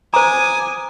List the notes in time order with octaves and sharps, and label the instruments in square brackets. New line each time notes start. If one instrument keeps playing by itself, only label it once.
[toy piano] C5 A#5 [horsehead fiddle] G#5 [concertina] D6 D#6